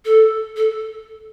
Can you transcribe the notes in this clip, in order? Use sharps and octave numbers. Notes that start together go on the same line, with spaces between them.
A4
A4